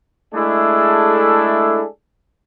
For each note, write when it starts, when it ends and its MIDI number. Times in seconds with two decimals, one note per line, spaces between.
0.34 1.84 56
0.34 1.84 57
0.34 1.84 62
0.34 1.84 64
0.34 1.84 68
0.34 1.84 69